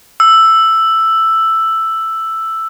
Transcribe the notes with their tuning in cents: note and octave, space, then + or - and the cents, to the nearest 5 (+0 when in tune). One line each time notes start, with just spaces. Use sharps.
E6 +5